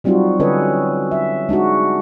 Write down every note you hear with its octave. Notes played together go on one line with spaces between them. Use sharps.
F#3 G3 C4 D#4 F4 F#4
D3 C#4 A4 B4 C#5 D#5
E5
G#3 D4 D#4 F#4